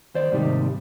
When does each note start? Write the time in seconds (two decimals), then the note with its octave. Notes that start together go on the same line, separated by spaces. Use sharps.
0.15 D#2 C5 D5
0.32 D#2 G#2 C3 G3 D#4 G4